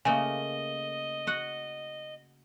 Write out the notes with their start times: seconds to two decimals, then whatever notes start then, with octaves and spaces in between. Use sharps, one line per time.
0.05 C#3 A3 A#3 D#5 G#5
1.27 F#4 F#5